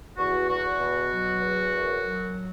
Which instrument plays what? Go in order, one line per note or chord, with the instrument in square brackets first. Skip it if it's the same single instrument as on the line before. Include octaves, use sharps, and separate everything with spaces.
[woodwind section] E2 F#4
E2 F#4
B2
F#3
E2
F#2
F#3